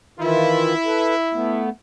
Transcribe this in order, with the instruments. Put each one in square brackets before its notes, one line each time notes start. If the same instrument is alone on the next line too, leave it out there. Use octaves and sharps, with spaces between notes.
[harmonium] D#3 E3 F4 [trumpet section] E4
[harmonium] A4 B4
A3 B3